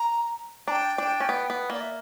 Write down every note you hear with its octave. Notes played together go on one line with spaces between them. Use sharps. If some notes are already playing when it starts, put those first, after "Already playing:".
Already playing: A#5
D4 G5 A#5
D4
C#4
B3
B3
A#3 D5
E5